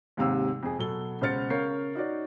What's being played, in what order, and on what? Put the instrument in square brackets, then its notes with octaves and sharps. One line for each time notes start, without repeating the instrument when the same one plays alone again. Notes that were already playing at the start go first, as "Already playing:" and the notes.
[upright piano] D#2 G#2 C3 F5 E6
F2 G#4
B2 F#3 A4 G7
C#2 B2 C5 F6 A6 C#7
C#3 A#4 C#5 F5 G6 C7
D#4 F#4 C#5 D5